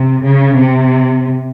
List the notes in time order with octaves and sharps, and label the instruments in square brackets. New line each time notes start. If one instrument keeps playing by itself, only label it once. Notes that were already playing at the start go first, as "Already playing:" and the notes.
Already playing: [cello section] C3
C#3
C3